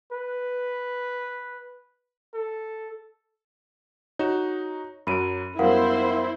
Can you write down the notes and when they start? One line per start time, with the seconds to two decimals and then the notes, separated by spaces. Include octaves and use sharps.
0.13 B4
2.34 A4
4.19 D#4 F#4 C#5 E7
5.07 F#2 F#3 B5 D7 D#7
5.59 F#2 G3 B3 E4 A#4 C5 F5 F#5